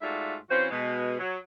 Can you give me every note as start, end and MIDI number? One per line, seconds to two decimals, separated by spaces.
0.02 0.36 44
0.02 0.36 57
0.02 0.36 65
0.02 0.36 66
0.02 0.36 74
0.02 0.36 76
0.50 0.67 52
0.50 0.67 60
0.50 0.67 61
0.50 0.67 65
0.50 0.67 66
0.50 0.67 72
0.70 1.16 47
0.70 1.16 56
1.19 1.37 54